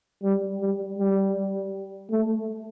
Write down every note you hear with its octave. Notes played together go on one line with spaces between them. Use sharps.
G3
G3
G3
A3